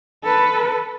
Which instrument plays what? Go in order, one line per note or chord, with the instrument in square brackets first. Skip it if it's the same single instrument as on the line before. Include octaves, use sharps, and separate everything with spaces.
[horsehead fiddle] A4 B4